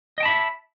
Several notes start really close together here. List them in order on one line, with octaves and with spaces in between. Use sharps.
D#5 G5 A5 B5 E5